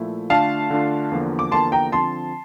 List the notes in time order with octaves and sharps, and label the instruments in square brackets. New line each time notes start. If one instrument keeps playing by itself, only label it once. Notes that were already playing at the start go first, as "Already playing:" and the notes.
Already playing: [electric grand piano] A#2 F3 A3 E4
[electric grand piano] D3 A3 D4 F4 [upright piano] F5 A5
[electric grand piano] D3 A3 D4 F4
E2 D3 F3 A#3
[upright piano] D6
[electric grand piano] E2 D3 F3 A#3 [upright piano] A5 C6
[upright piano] G5 A#5
[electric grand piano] D3 F3 C4 [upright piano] A5 C6